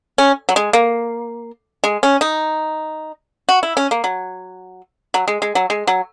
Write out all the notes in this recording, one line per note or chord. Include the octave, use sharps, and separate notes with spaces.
C#4
F#3
G#3
A#3
G#3
C#4
D#4
F#4
E4
C#4
A#3
F#3
F#3
G#3
G#3
F#3
G#3
F#3